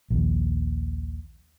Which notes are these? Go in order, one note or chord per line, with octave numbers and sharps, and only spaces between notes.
A#1 D#2